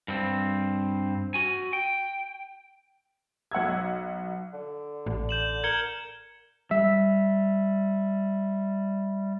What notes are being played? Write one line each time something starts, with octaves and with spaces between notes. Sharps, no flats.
G2 C4
F#4 G#5
G5
B1 F#5 E6 G#6
D3
A1
G6 E7 F#7
A#4 G#6 C#7 G7
G3 E5